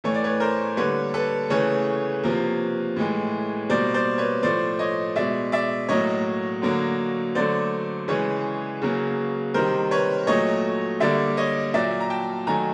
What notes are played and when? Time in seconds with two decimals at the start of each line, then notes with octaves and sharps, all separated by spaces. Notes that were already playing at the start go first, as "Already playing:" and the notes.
0.04 A2 E3 A3 C#5
0.14 D5
0.24 B4 C#5
0.40 A#4 C5
0.77 D3 G3 A#3 B4 C#5
1.14 A4 B4
1.50 C#3 E3 A3 B4 C#5
2.24 C3 F3 A#3
2.96 A2 E3 G#3
3.69 B2 G3 A#3 C5 D5
3.94 C5 D5
4.18 B4 C#5
4.42 A2 F3 A3 C5 D5
4.79 C#5 D#5
5.16 B2 G#3 D5 E5
5.52 D5 E5
5.88 A2 F#3 A#3 C#5 D#5
6.62 D3 F#3 A#3
7.35 D3 F#3 A3 C5 D5
8.08 C#3 E3 G#3 B4 C#5
8.82 C#3 F#3 A#3
9.54 C3 D#3 G3 A#4 C5
9.91 B4 C#5
10.27 A#2 F#3 A3 C#5 D#5
11.00 D3 G3 A#3 D5 E5
11.37 C#5 D#5
11.74 A#2 F#3 A#3 D5 E5
12.00 A#5
12.10 G5 A5
12.47 D#3 F#3 A3 G#5 A#5